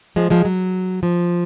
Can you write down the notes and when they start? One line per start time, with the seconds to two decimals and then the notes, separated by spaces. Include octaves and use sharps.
0.16 F3 G#3
0.30 F3 G#3
0.45 F#3
1.03 F3